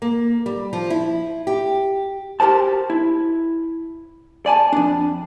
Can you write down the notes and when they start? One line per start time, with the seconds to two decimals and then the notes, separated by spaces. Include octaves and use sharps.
0.02 A#3
0.46 G3
0.73 F3
0.90 E4
1.47 G4
2.40 F#4 G4 A#4 C5 A5
2.90 E4
4.46 D5 G#5 A5
4.73 F2 D4